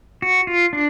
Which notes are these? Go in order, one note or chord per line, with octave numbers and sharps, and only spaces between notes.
F#4
F4
D4